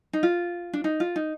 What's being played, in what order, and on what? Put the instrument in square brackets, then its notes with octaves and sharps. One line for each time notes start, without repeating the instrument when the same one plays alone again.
[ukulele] D#4
F4
D4
D#4
F4
D#4